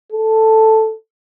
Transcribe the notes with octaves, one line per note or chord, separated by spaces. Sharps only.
A4